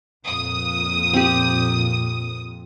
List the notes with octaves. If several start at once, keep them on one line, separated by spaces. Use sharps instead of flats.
F2 A#2 D#6
C4 G4